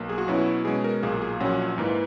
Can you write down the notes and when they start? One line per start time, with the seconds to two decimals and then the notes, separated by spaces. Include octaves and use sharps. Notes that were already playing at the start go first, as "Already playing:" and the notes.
Already playing: B1 A#3
0.09 G#4
0.18 F#4
0.28 B2 F#3 C#4 E4
0.38 F#4
0.65 B2 G#3 C#4 G#4
0.84 A#4
1.03 B1 A#2 A#3 G#4
1.22 G#4
1.40 A#1 A#2 F#3 C#4 F#5
1.78 G#2 E3 A#3